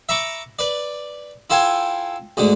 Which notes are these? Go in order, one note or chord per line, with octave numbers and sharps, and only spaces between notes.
E5 A#5 B5 C#6 D6
B4 D5
E4 F4 A4 G5 G#5
D2 G#2 D3